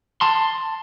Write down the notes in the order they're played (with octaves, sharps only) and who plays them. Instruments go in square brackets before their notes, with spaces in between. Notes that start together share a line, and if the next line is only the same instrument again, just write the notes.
[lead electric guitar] A5 C6